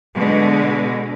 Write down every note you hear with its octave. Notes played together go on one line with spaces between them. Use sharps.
B2 D3 G#3